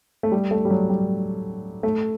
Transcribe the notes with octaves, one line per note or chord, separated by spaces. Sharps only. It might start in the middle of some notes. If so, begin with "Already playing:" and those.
A3
G3
A3
G3
F#3
G3
A3